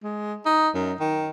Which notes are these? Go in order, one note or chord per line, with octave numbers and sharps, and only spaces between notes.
G#3
D#4
F#2
D#3